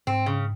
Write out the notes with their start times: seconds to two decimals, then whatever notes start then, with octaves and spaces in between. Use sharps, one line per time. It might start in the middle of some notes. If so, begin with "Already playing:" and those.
0.07 G#2 C4
0.26 C#3